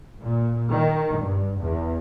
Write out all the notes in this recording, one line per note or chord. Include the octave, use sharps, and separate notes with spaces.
A#2
D#3
G2
E2